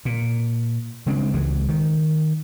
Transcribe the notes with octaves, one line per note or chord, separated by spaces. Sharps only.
A#2
C#3 G#3 C4 D4
C#2 E3 G#3
D#3